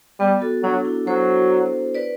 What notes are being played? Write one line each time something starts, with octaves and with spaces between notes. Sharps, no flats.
G3 B3
F#4 A4
F#3 D4
E4
F#3 A4 C5
B4 D5